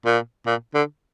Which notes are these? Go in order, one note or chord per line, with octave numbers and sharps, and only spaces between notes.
A#2
A#2
D3